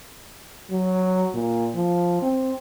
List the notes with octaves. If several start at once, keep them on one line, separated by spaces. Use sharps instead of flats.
F#3
A#2
F3
C4